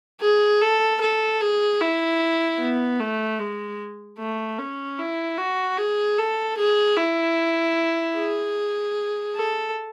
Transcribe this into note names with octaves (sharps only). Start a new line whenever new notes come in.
G#4
A4
A4
G#4
E4
B3
A3
G#3
A3
C#4
E4
F#4
G#4
A4
G#4
E4
G#4
A4